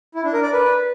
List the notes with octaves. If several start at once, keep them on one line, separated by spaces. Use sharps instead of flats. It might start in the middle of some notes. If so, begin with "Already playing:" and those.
E4
D4
A#4
D5
B4